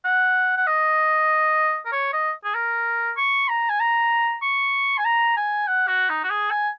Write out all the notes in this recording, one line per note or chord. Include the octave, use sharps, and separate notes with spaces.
F#5
F#5
D#5
A#4
C#5
D#5
G#4
A#4
C#6
A#5
G#5
A#5
C#6
G#5
A#5
G#5
F#5
F#4
D#4
F#4
G#4
G#5